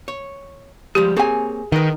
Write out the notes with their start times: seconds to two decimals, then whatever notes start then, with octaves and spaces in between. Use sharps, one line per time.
0.08 C#5
0.95 F3 G3 G#3 G4
1.16 A#3 C4 G#4 C#5 G#5
1.72 D#3 B4 D#5